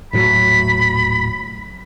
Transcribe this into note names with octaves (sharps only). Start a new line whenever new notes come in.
D#1 A2 F#3 B5